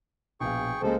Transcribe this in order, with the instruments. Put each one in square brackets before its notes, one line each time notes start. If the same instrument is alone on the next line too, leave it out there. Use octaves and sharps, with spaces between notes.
[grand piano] A#1 B2 F5 [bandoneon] G#4 G5 C#6
[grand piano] C#2 C#3 A#3 [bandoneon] F3 [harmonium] G#3 A4 C5